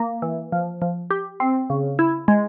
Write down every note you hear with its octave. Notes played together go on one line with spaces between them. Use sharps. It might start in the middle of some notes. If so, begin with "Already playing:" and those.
Already playing: A#3
E3
F3
F3
G4
C4
C#3
E4
G#3